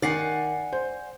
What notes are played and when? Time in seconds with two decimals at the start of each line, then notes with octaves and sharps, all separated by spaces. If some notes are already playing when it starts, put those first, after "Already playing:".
0.02 D#3 D5 F#5 G#5 C7
0.72 C5